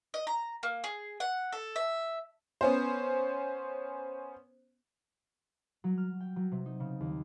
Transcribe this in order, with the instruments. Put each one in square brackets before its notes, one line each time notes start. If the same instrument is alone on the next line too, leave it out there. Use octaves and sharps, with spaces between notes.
[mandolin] D#5
A#5
A#3
G#4
F#5
A4
E5
[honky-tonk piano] B3 C#4 C5
[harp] F#3
F6
G5
F#3
C3
D#4
C#3
D#2